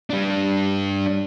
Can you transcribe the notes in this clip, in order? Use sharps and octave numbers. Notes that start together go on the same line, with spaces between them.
G3 D4